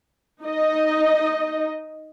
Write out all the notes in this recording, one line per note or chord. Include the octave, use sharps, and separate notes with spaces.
D#4 D#5